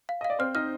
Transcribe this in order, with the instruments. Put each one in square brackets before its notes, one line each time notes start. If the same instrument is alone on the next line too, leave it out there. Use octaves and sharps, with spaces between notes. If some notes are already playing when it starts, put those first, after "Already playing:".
[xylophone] F5
[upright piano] D#5 [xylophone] F5
[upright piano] D5
[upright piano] C4 C5 [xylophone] F6
[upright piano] D#4 D#5 [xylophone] F6